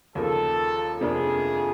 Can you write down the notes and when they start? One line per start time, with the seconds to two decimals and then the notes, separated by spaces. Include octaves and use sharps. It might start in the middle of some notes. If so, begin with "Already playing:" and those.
0.15 D#2 C#3 F3 A#3 A4
1.01 F2 C3 F3 A#3 D4 G#4